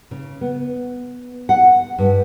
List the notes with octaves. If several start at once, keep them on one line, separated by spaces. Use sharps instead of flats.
C#3
B3
F#5
G2